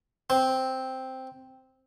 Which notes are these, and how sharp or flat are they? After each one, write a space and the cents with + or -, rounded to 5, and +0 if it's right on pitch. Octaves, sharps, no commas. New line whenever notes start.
C4 +0